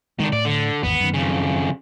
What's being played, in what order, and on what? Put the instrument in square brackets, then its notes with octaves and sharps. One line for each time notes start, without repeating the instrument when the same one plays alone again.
[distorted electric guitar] D#3 D4 [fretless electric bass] G#3
[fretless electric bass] A2 [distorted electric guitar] D5
[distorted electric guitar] D3
[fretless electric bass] G#1 E2 [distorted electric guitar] B3
[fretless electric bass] F#2 D#3
[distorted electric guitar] F2 C#3